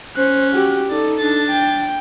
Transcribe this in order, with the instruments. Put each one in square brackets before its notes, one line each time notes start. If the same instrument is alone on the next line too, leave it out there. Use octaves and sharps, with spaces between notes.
[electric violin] C#4 F#6 [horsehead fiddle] C5
[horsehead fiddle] F#4 G4
[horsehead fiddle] D#4 A4 [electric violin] D5
[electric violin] D4 A6
[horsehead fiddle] G5